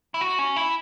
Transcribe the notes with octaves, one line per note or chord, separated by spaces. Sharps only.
E4
F#4
C#4
E4